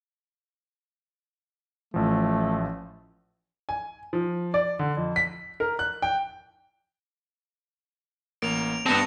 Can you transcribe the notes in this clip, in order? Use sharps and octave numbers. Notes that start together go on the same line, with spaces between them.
A1 F3 A3
G#5
F3
D5
D3
F2
B6
A#4
F#6
G5
A1 A#3 D7 F7
G2 B3 C4 A5 A#6 C#7 F7